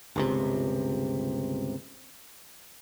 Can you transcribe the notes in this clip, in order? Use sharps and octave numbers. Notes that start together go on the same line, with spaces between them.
G1 C#2 C3